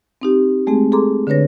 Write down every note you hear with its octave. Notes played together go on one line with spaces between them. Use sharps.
C4 D#4 G4
G#3 A3 C4 G#4
G#4 A4 A#5 C6 D6
D3 D4 B4 C#5 A#6